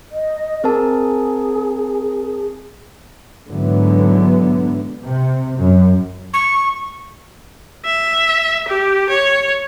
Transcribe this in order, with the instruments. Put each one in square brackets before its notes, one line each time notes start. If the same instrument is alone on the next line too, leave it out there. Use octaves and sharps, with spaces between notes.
[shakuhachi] D#5
[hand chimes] C4 A#4 A5 [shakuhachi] G#4
[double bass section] G#2 D3 E3 F#3 B3
C3
F#2
[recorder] C#6
[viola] E5
G4
C#5